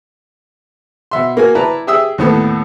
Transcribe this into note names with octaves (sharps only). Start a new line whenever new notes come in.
B2 E5 C6
A#3 F#4 G#5
E4 B4 D5 A5 A#5
G4 G#4 E5 D#6 E6
D#2 A2 B3 A4